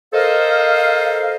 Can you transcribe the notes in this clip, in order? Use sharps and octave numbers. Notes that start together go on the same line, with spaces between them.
A4 A#4 C5 D#5 F5